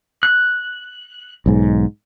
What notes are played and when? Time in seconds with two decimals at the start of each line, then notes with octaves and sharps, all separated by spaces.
0.23 F#6
1.46 B1 G#2